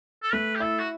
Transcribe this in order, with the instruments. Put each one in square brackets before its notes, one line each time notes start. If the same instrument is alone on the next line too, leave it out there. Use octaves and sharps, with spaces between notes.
[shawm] A4
[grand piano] A3 [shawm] B4
[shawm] G4
[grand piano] E4 [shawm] A4
[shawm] F#4